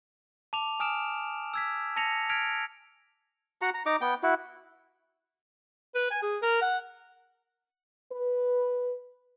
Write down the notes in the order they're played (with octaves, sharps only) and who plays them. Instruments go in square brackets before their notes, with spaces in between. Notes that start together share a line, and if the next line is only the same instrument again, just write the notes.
[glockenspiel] A5 D6 F7
G#5 D#6 F6 D7 E7
E6 G#6 B6
A5 A#6 C#7 F7
F6 G#6 B6 D7 F7
[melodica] F#4 F#5 A#5
A#5
D#4 A#5 D6
B3 G5
E4 F#4
[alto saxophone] B4
G#5
G#4
A#4
F#5
[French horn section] B4